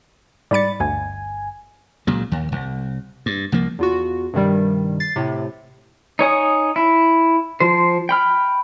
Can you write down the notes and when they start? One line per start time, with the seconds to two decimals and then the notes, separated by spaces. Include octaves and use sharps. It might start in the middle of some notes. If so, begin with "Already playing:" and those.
0.51 G#2 G3 D5 B5 A6 C#7
0.80 G1 D2 G#5
2.07 C#2 A#2 C#3 F#3
2.32 D#2
2.52 C2
3.26 G2
3.52 C2 F3 A#3
3.79 E2 F4 F#4
4.34 G2 C3 D#3 G3
5.00 A6 C7
5.16 A2 C3
6.19 D#4 C#5 G#5 D#6
6.76 E4
7.60 F3 C5
8.09 G5 B5 F6